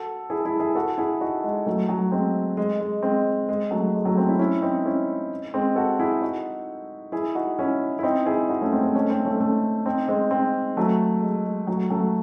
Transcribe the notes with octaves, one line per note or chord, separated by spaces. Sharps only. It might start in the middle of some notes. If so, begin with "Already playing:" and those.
Already playing: F#4 A4
E4 G#4
E4 G#4
E4 G#4
F#4 A4
E4 G#4
D#4 F#4
G#3
F#3 A3
F#3 A3
G#3 C4
G#3
G#3
G#3 C4
G#3
F#3 A3
G#3
F#3 A3
C4 D#4
C#4 E4
C#4 E4
C4 D#4
C#4 E4
G#3 C4
F#4 A4
E4 G#4
D#4 F#4
E4 G#4
D#4 F#4
C#4 E4
E4
C4 D#4
E4 G#4
D#4 F#4
A3 C#4
G#3 C4
G#3 C4
A3 C#4
C4 D#4
A3 C#4
A3 C#4
C4 D#4
G#3 C4
G#3 C4
F#3 A3
G#3
G#3
F#3 A3
F#3 A3